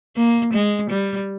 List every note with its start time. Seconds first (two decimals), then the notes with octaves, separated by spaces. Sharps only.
0.17 A#3
0.54 G#3
0.90 G3